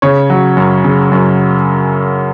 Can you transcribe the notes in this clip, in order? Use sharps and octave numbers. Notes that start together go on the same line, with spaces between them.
C#3 C#5
F#3
F#2
C#3
F#2